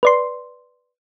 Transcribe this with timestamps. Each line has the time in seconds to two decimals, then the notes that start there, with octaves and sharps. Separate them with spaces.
0.03 B4 D5 C6